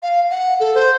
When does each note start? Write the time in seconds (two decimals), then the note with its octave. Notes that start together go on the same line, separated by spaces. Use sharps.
0.03 F5
0.31 F#5
0.60 A4
0.75 C5